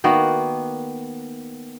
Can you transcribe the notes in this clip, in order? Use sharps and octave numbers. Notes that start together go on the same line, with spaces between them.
D#3 A#3 B3 F#4